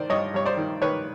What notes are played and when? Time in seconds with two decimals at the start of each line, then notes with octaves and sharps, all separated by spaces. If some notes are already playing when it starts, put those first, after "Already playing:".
Already playing: D#3 C5 D5
0.09 G2 C#5 D#5
0.34 G2 C#5
0.46 C5 D5
0.57 D#3
0.82 D#3 B4 C#5